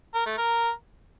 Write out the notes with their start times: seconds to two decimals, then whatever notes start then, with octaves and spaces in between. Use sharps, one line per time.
0.15 A#4
0.26 A3
0.38 A#4